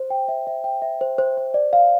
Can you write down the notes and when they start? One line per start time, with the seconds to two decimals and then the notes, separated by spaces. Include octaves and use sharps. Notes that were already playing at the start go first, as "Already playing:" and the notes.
Already playing: C5
0.10 G5
0.28 E5
0.47 E5
0.64 G5
0.82 E5
1.01 C5
1.18 C5
1.37 C5
1.54 D5
1.73 F5